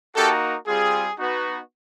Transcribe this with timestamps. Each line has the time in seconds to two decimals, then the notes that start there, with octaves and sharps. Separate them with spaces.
0.15 A#3 D#4 F#4 G4 A4
0.67 G3 C4 F4 G#4
1.18 B3 D#4 F#4